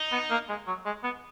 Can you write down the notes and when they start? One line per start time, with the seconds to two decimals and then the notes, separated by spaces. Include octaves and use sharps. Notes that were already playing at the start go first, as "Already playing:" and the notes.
Already playing: D#4
0.12 B3
0.30 A#3
0.49 G#3
0.67 F#3
0.86 G#3
1.03 B3